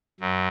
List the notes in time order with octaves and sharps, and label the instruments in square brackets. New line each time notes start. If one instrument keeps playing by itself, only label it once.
[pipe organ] F#2